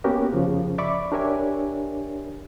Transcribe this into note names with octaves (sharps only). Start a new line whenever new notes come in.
A#3 B3 C#4 F#4 G4 A#4
F2 C#3 F3
D5 E5 B5 C#6 D6
D4 G4 A#4 C#5 E5 G#5